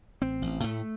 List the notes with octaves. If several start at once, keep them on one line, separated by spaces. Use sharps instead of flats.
A1 C4
A1
A2 A3